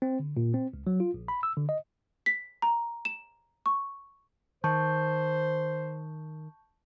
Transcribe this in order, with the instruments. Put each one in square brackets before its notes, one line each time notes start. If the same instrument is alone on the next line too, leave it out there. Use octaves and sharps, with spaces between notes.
[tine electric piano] C4
D3
A#2
C4
C#2
F#3
F4
A#1
B5
E6
D3
D#5
[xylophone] B6
A#5
E7
C#6
[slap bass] D#3 [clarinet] C5 [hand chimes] A5 C#6 G6